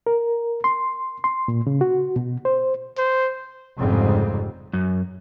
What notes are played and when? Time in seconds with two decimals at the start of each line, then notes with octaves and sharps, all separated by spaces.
0.07 A#4
0.64 C6
1.24 C6
1.48 A#2
1.67 C#3
1.81 F#4
2.16 B2
2.45 C5
2.98 C5
3.78 F1 F2 G#2 C#3 G3 C4
4.73 F#2